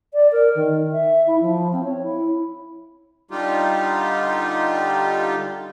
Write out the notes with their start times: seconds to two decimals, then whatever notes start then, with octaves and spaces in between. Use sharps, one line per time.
0.14 D5
0.32 A#4
0.55 D#3
0.92 E5
1.27 E4
1.41 F3
1.73 C4
1.84 C#5
2.02 E4
3.31 D3 G3 D#4 F4 G4